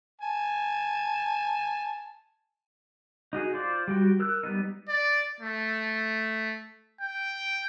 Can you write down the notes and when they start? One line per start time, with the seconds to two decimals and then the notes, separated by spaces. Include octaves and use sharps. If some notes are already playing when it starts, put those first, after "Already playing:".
0.22 G#5 A5
3.33 D#4 F#4 G#4
3.54 F4 C5 D5
3.88 G3 F#4 G5
4.20 A#4 E6 F#6
4.43 G3 B3 D#4
4.89 D5
5.41 A3
7.01 G5